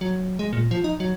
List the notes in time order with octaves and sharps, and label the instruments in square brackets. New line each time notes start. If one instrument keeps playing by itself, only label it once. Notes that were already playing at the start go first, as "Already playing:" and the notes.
[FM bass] F#3
G#3
A#2
F3
D#4
F#3